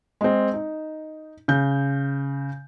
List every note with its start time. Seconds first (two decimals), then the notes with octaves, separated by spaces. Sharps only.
0.21 G#3 C4
0.54 D#4
1.48 C#3 G6